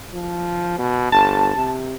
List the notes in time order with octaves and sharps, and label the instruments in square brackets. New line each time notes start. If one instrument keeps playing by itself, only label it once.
[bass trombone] F3
B2
[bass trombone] G1 [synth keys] A5
[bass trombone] C3